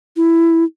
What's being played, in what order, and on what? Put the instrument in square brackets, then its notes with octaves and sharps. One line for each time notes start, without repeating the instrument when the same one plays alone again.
[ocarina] E4